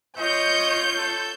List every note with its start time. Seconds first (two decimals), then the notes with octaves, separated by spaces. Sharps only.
0.18 F4 C#5 D#5 G6
0.97 A4